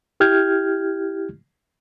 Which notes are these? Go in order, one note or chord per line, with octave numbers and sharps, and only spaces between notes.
E4 G4 F6 G6 G#6